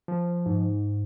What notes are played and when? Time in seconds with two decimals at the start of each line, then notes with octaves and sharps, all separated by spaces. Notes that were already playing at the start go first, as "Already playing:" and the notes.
0.08 F3
0.46 G#2